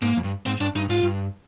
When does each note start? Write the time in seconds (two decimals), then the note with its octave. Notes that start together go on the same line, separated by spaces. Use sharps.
0.02 G#2 A#3
0.17 F2
0.24 G2
0.46 G#2 C4
0.61 G2 D4
0.75 G2 D#4
0.89 G#2 F4
1.03 G2